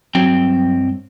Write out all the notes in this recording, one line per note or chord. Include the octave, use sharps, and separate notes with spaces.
G2 F#3 C4 G5